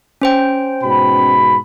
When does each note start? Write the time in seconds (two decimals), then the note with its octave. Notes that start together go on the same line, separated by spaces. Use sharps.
0.22 C#4 C5 G5
0.84 G#2 B2 B5